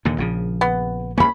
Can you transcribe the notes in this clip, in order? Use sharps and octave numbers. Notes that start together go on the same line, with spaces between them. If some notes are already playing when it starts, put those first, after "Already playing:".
D#2 A#2 D3
A#1 C#3 F3
B3
C2 F2 A#3 C#4 B5